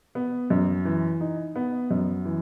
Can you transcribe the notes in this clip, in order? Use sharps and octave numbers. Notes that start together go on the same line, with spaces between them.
B3
F#2
E3
D#4
B3
F#2
E3